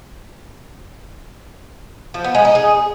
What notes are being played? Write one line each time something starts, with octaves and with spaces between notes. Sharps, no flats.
F3
B3
G#3
D#4
G#4